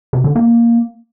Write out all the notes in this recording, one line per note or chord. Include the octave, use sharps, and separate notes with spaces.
C3
D3
A#3